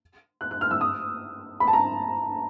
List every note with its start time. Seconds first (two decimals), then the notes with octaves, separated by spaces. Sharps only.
0.41 F#6
0.51 F#6
0.61 F6
0.71 E6
0.81 D#6
1.60 B5
1.67 A5
1.73 A#5